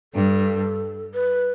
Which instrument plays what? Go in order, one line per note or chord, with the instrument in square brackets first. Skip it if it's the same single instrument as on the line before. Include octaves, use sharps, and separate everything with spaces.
[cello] G2 [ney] A4
[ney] B4